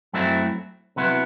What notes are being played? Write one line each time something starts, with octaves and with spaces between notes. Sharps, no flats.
F#2 F#3 A3 C4 E4
C3 F#3 B3 E4